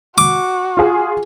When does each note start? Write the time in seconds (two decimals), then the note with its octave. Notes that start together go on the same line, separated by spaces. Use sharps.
0.18 F#4 D6
0.77 F4 G#4